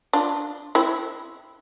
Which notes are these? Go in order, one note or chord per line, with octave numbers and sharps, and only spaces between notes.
D4 F4
C4 E4